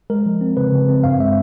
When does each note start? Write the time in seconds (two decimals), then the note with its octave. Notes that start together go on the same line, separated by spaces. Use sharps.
0.10 G#3 A#4
0.26 F3
0.41 C4
0.57 C#3 B4
0.72 C#3
0.89 C4
1.04 G2 F5
1.20 G#3 E5